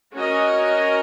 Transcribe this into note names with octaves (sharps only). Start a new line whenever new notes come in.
C#4 F#4 A#4 D#5